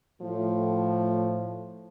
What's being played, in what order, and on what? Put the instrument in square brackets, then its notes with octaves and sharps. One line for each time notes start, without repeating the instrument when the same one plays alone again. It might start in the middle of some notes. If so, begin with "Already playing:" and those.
[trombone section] A2 [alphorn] F3